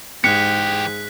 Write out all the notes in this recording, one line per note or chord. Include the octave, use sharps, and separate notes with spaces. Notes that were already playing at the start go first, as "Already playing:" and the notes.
G#2 E3 G4 G#4 F#6 B6 C#7